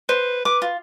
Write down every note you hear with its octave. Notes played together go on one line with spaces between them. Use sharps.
B4 C5
B4 D6
F4